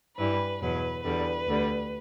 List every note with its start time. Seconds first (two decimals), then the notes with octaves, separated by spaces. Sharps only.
0.18 G2 E3 G3 B4
0.62 E2 B2 F#3 B4
1.04 E2 D3 G3 B4
1.47 D2 D3 G3